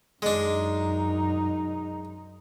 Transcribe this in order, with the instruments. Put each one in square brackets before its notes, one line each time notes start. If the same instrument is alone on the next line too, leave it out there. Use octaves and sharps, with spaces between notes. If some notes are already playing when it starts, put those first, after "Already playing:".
[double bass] F#2 D#4 [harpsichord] G#3 D4